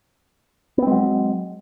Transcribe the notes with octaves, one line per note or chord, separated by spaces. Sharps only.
F#3 G#3 B3 C4